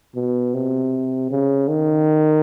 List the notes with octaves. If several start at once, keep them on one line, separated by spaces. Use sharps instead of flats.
B2
C3
C#3
D#3